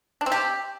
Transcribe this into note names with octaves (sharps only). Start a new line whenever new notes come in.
D4
C4
G4